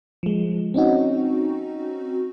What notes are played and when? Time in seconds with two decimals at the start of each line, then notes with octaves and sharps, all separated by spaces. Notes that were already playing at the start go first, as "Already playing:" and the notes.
0.23 F3 G#3
0.74 C4 C#4 D#4 F#4